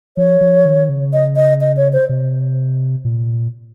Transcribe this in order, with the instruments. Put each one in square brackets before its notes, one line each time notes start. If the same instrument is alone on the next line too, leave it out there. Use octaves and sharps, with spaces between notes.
[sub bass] F3 [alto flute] C#5
[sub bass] F3
D#3
C#3
[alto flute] D#5
D#5
D#5
C#5
C5
[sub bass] C3
A#2